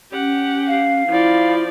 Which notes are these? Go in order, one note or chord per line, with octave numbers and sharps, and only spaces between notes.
C#4 G4 F#5
F5
F3 E4 D5